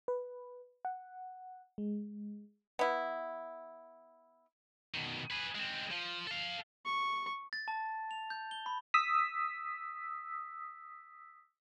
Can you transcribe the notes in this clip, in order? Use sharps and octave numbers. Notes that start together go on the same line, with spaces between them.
B4
F#5
G#3
B3 E4
B2 D#3
G#4 B4
G#3 C4
F3
A4 F5
C#6
A6
A5
F7
G6
G7
B5
D#6 E6 B6